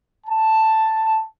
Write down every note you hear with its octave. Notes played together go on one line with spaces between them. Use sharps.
A5